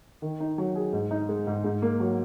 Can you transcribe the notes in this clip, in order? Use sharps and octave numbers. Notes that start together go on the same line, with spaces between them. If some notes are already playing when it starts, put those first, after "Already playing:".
D#3
D#4
F#3
G#4
G#2
D#4
G#3
G#2
G#2
A#3
F#3